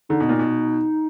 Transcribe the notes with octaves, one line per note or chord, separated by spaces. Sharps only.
D3 D#4
B2
A#2
B2